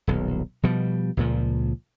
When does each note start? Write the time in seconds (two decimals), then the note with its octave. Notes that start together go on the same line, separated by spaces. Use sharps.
0.07 D#1 B1
0.63 B2 F3 G3
1.17 C#2 A#2 F3